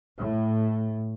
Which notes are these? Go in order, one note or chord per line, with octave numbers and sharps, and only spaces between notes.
A2